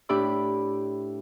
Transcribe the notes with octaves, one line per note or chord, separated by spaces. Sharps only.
A2 D4 G4 D5 B5 E6